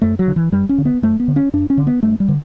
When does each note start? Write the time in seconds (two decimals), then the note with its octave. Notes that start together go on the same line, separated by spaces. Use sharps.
0.02 F#2 A3
0.19 F#3
0.28 D3
0.36 E3
0.52 F#2 G3
0.69 C#4
0.78 D3
0.85 B3
1.02 F#2 A3
1.20 B3
1.28 D3
1.36 C#4
1.53 F#2 D4
1.70 C#4
1.77 D3
1.87 B3
2.03 G2 A3
2.20 G3
2.28 D3